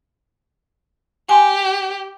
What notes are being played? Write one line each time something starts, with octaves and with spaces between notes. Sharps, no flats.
G4 G#5 C6